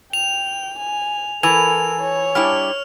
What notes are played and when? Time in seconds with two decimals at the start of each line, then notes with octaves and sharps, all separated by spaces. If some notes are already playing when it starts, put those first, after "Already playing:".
0.13 G5 F7
0.78 G#5
1.43 E3 A4 A#4 G#5 E6 F7
2.01 C#5
2.35 G3 D4 E4 F6